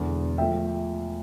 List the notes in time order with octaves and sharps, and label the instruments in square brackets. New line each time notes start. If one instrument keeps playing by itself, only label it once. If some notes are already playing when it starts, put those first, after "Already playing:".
Already playing: [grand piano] E1 E2 D3
F3 A3 E5 G5